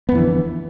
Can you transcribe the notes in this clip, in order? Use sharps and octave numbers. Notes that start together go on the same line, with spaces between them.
F2 D3 E3 B3